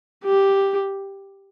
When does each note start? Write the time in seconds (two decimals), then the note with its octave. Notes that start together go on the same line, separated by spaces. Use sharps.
0.24 G4